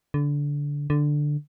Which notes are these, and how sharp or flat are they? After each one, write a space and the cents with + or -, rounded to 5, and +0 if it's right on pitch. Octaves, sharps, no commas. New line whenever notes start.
D3 -20
D3 +5